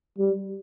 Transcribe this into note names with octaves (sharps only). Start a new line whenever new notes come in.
G3